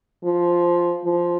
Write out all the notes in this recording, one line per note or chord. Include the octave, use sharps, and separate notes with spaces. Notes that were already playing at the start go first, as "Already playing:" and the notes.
F3
F3